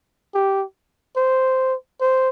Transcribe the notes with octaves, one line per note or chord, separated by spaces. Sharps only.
G4
C5
C5